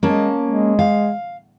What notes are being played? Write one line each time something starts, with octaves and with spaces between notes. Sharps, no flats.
G#3 A#3 C#4 A5
G#3
F5